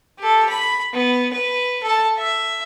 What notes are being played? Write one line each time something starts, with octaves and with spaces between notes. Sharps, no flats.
G4 A4
B5
B3
B4
A4 A5
E5